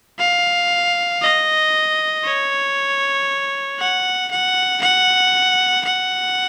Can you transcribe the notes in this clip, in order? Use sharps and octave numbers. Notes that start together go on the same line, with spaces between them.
F5
D#5
C#5
F#5
F#5
F#5
F#5